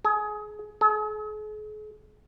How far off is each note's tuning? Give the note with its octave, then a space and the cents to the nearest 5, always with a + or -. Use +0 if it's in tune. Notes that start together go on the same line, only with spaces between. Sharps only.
G#4 +25
G#4 +45